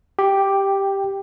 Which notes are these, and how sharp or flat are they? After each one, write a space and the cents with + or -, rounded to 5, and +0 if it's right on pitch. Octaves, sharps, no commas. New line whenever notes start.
G4 +0 G5 +15